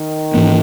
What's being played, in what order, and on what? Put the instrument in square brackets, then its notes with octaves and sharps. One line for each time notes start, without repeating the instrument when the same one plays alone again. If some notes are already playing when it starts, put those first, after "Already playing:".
Already playing: [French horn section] D#3
[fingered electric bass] G#2 E3 A#3 C#4